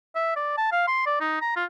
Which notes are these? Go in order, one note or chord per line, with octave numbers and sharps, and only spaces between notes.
E5
D5
A5
F5
C6
D5
D#4
A#5
F4